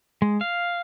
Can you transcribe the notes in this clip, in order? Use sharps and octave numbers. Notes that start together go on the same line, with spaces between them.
G#3
F5